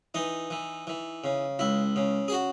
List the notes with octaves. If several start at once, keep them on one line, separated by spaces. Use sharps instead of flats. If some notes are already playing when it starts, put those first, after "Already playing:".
E3 D#4
E3
E3
C#3
C#2 E4
C#3
G#4
F#4